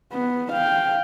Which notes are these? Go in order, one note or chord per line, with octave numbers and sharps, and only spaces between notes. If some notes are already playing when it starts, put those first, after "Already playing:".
B3
F5 G5